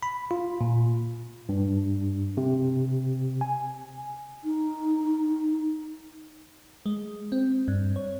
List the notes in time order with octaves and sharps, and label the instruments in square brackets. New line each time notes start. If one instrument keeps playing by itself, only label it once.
[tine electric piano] B5
F4
A#2
G2
C3
G#5
[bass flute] D#4
[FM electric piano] G#3
C4
G2
C#5